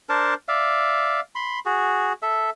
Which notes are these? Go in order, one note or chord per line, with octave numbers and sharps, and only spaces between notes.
D4 A#4 C5 A5
D5 E5 F5
B5 C6
F#4 G#4
A4 E5